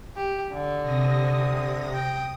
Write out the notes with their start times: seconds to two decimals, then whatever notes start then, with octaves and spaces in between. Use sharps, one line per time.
0.16 G4
0.54 D3
0.82 C3 D#6 A#6
1.94 G5 D#6